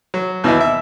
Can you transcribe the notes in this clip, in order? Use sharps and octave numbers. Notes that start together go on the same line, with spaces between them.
F#3
D#2 B2 E3 D#4 E4
E5